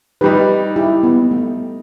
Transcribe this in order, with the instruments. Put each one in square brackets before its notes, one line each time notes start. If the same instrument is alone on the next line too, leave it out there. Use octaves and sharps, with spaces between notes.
[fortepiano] D#3 G3 D#4 [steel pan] G4 B4
[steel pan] E4 G4
B3
A3